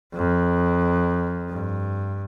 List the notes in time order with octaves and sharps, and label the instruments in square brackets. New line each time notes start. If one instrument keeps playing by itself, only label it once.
[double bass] F2
G2